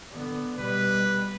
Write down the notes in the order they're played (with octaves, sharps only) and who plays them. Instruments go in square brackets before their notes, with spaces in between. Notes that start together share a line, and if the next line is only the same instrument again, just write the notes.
[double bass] D3 B3
[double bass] B2 G3 [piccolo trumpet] B4